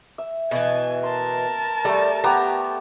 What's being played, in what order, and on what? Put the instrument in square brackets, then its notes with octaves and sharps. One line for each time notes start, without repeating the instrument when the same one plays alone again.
[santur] E5
[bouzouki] B2 E3 [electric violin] G#5
[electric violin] A#4 A5 [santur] C6
[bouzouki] G3 [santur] A3 A4
[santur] B3 G4 G5 [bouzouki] A#5